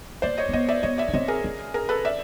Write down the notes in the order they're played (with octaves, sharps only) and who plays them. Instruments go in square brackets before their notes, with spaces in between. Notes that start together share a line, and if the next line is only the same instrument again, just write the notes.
[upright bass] A#3 [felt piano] C5 D5
[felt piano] C#5 D#5
[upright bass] C4
[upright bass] B3 [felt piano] C#5 D#5
[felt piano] D5 E5
[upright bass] B3 [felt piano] C#5 D#5
[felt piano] D5 E5
[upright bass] C#4
[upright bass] C4 [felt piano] C#5 D#5
[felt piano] G#4 A#4
[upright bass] C#4
[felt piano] G#4 A#4
A4 B4
D5 E5